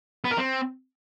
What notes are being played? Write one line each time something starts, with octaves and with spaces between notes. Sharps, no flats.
B3
A#4
C4